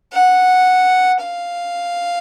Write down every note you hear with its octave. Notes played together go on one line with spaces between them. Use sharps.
F#5
F5